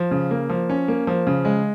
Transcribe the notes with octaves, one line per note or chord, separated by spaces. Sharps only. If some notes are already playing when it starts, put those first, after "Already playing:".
Already playing: F3
C#3
A#3
F3
C#4
A#3
F3
C#3
G#3